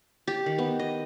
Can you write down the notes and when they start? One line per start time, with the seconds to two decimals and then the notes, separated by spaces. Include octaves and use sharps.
0.27 G4
0.46 D#3
0.58 B3
0.80 D#5